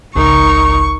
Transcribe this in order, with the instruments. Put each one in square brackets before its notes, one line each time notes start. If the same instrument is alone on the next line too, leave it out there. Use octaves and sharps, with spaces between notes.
[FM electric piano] G#1 C#2 [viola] D#4 A#4 [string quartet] C#6